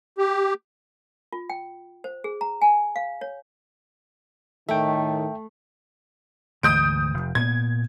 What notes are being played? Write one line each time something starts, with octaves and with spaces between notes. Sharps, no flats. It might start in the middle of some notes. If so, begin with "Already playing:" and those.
G4
F4
G5
C5
G#4
A#5
G#5
F5
C#5
A2 D#3 A3 E5 G5
D2 G#2 E3 D#6 G6 D7
F1
A#2 B3 G#6